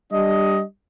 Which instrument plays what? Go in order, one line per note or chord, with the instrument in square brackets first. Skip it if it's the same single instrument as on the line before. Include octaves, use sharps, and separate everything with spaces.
[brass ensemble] G3 D4 G4 D#5